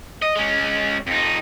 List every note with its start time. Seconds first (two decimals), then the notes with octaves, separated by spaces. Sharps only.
0.22 D#5
0.36 G#3 C#4
1.07 F2 D#4